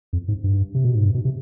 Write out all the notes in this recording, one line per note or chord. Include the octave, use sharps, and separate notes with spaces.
F2
G#2
G2
C3
B2
G#2
G2
B2
C3